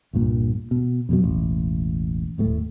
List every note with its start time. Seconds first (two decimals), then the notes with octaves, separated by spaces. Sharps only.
0.13 C2 G2 A#2
0.71 B2
1.09 F2 B2 F#3
1.23 E1 A1
2.38 D#1 A2 G3 A3